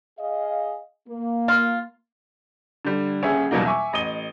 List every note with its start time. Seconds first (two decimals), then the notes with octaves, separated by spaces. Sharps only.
0.19 G#4 D#5 F5
1.09 A#3
1.48 F4
2.85 D3 G3
3.22 D#1 C#4 G#4 E5
3.51 E2 B2 F#3 G3 A#3 D#4
3.66 E5 G#5 C#6 D6
3.93 A1 D#5 D#6 D#7 G7